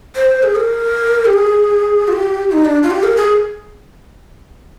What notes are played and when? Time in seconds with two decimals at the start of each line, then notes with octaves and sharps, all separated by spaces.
0.16 C5
0.43 G#4
0.56 A#4
1.25 G4
1.34 G#4
2.08 F4
2.13 G4
2.52 D#4
2.65 D4
2.83 F4
2.91 G4
3.03 A#4
3.17 G#4